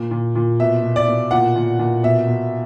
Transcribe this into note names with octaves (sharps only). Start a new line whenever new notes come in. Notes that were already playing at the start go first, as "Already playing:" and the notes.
Already playing: A#2
A#2
A#2
B2 E5
B2
D5
B2
A#2 F#5
A#2
A#2
B2 E5
B2